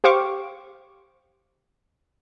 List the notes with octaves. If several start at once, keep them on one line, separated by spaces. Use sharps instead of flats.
G4 C5 F5 C#6 D6